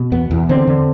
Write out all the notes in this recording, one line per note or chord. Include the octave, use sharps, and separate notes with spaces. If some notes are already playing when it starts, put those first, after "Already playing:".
Already playing: B2
E2 B3
E2
D3 C4
D3